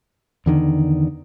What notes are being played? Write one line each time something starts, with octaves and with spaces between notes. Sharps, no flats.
E2 D3 D#3